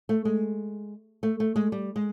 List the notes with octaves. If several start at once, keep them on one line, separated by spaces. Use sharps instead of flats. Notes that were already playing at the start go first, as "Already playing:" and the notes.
A3
G#3
A3
A3
G#3
G3
G#3